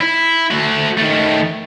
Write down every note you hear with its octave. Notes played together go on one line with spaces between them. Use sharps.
E4
A3 F#4
D#3 A3